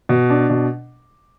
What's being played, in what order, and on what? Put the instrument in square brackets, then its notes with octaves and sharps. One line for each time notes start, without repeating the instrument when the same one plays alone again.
[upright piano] B2
D4
B2